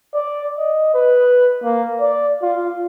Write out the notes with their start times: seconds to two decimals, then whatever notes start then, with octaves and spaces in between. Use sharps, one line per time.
0.14 D5
0.58 D#5
0.94 B4
1.64 A#3
2.01 D5
2.42 F4